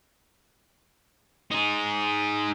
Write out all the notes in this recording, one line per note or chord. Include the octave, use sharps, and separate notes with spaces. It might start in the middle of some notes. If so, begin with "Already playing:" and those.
D#4 G#4